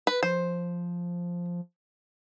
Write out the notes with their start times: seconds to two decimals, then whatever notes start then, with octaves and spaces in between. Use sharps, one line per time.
0.07 B4
0.23 F3 C5